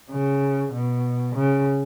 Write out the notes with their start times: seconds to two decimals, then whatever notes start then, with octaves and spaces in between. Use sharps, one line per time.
0.11 C#3
0.74 B2
1.36 C#3